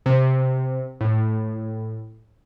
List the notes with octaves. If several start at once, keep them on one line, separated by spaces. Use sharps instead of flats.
C3
A2